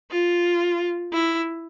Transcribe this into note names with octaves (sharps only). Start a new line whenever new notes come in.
F4
E4